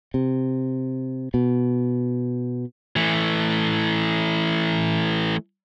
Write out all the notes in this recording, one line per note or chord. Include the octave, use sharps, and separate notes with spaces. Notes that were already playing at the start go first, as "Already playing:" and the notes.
C3
B2
E3 A3